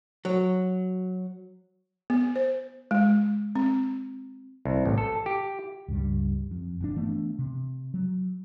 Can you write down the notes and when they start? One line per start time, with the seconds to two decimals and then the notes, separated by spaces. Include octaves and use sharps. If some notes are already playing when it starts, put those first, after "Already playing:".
0.25 F#3
2.10 B3
2.36 C5
2.91 G#3
3.55 C4
4.65 C2
4.85 A1
4.98 A4
5.26 G4
5.88 C#2 G2 F3 G3
6.51 F2
6.81 G1 C#3 D4
6.96 E3 A3 B3 D4
7.39 C3
7.94 F#3